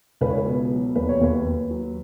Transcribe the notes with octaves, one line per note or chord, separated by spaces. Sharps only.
C#2 B4
C#5
B4
B2
F#3
D#2 B4
C#5
D#2 B4
D#2
F#3